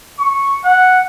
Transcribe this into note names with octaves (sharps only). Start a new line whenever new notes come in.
C#6
F#5